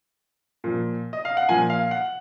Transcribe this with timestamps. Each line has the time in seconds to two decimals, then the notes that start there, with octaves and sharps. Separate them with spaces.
0.64 A#2 F3
1.13 D#5
1.25 F5
1.37 F#5
1.49 A#2 F3 G#5
1.70 F5
1.91 F#5